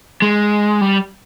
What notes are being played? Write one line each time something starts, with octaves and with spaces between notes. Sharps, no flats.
G#3
G3